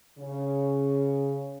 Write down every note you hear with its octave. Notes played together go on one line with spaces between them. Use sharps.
C#3